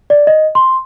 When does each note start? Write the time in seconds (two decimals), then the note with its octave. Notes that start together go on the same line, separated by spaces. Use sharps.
0.10 D5
0.27 D#5
0.55 C6